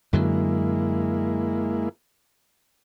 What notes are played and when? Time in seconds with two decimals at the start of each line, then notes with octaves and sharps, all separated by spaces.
0.13 F#2 D3 F#3 G#3 A#3 E4